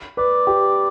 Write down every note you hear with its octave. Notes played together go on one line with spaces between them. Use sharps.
B4 D5
G4